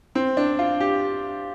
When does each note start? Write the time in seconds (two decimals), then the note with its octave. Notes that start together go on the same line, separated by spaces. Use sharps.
0.15 C4
0.37 D4
0.59 F4
0.80 G4